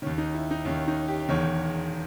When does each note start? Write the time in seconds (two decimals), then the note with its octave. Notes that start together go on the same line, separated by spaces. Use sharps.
0.02 D#3 C#4
0.07 D#2
0.18 D#4
0.34 E4
0.51 D#4
0.65 D#2 D#3 C#4
0.88 D#4
1.08 G4
1.29 E1 E2 D#3 C#5